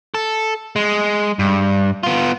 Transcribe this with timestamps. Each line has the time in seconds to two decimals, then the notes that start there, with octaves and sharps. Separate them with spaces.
0.15 A4
0.76 G#3
1.39 G2
2.03 B3 F4